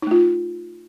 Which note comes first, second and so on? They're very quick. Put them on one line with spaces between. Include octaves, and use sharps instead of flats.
D#4 A3 F4